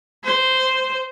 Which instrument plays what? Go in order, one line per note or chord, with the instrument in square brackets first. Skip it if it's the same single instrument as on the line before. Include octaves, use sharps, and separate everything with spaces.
[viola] C5